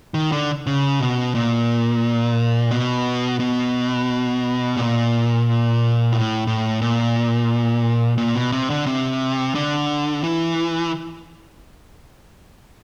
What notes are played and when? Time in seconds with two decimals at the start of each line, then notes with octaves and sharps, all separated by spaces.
0.14 D#3
0.32 D3
0.67 C#3
1.00 B2
1.35 A#2
2.71 B2
3.40 B2
4.76 A#2
6.13 A2
6.47 A2
6.81 A#2
8.18 A#2
8.35 B2
8.52 C3
8.70 D3
8.86 C3
9.55 D3
10.24 E3